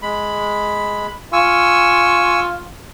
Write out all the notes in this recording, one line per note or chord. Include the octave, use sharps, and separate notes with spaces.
G#3 B5
F4 G#5 C#6 E6